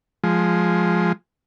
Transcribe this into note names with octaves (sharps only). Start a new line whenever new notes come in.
F3 G#3